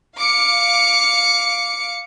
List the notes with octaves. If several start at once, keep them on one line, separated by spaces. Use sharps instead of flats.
F5 D6 C#7